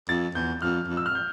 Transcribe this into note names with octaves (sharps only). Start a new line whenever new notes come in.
F2 A6
E2 G6
F2 F6
F2
E6
F6
G6